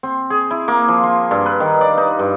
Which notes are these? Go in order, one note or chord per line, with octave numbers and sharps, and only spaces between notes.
C4
G#4
E4
A#3
F3
F4
G2
B4
D#3
D5
D#4
G2